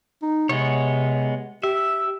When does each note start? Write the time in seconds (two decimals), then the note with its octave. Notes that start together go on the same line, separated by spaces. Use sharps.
0.23 D#4
0.49 C3 G#3 B3 C#5
1.64 G4 E5